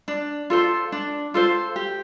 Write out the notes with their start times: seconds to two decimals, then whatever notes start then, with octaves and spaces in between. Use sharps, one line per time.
0.08 D4
0.50 F4 A4 C5
0.92 D4
1.34 F4 A4 C5
1.76 G4